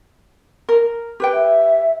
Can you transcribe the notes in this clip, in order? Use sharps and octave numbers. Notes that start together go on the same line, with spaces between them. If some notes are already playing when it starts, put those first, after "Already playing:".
A#4
G4 B4 G5
E5